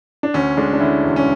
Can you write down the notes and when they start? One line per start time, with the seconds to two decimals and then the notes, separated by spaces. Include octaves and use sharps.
0.23 D4
0.34 D2 C#4
0.57 G#3 D4
0.73 D4
0.80 D3 C#4 E4
1.04 E1
1.16 C#4